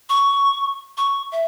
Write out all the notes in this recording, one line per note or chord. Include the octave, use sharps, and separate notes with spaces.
C#6
C#6
E5